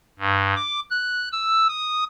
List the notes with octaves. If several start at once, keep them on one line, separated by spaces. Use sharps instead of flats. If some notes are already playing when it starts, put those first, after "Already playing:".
G2
D6
F#6
E6
D#6